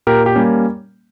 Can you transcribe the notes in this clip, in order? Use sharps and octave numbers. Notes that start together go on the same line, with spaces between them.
A#2 G4 A#4
G4
G3 A#3 C#4